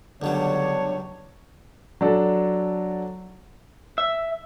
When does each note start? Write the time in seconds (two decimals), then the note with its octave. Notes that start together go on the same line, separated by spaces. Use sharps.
0.22 C#2 D3 F#3 G3 B3 D4 C#5
2.01 F#3 D4 A4
3.98 E5